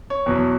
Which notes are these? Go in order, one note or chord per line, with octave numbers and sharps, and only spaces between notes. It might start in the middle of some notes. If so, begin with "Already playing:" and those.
C#5
E2 B2 F#3